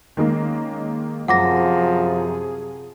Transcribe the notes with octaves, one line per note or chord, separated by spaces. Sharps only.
D#3 G#3 A#3 C#4
F#2 C3 F3 G#4 F#5 D6 A#6